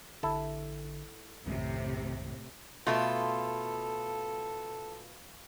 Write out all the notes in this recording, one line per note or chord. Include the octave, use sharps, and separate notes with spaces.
A1 D3 E4 A4
B1 F#2 A2 C3 D#3
B2 A3 F4 A4